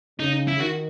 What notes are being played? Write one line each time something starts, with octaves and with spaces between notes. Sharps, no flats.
C#3 D#4
E4
D#3 F#4